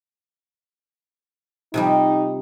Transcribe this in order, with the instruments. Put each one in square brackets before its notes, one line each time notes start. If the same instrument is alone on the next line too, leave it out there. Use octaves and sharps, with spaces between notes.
[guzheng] C3 F3 G3 [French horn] D#4